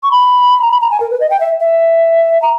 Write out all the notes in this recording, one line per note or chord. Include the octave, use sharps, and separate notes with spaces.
C#6
B5
A#5
B5
A#5
G#5
A#4
B4
D#5
G5
E5
E5
A#5